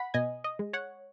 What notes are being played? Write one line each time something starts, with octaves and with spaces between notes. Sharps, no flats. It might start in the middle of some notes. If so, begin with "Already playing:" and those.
Already playing: F#5 B5
B2 D#5 G#5
D#5
G#3
C#5 F#5